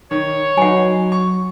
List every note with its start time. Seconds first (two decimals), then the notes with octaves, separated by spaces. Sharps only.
0.11 D#3 C#5
0.58 F#3 D#4 B4 F#5 G#5
1.12 C#6